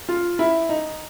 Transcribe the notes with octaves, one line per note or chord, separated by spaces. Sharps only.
F4
E4
D#4